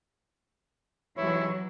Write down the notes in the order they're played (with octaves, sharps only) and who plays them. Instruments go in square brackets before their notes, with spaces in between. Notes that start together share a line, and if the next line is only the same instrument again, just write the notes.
[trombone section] G#2 C3 E4 [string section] E3 F#3 [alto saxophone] C#5